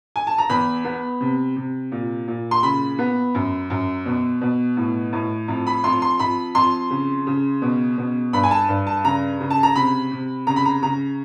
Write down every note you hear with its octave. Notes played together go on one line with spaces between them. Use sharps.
G#5
A5
A#5
E2 B5
B3
C3
C3
A#2
A#2
C6
C#3 B5
B3
F#2
F#2
B2
B2
A2
A2
F2
B5
F2 C6
C6
F2 B5
F2 C6
C#3
C#3
B2
B2
G2 B5
G#5
A5
G2
A5
C#3 A#5
C#3
A5
A#5
C3 B5
C3
C#3 A#5
B5
A#5
C#3 A#5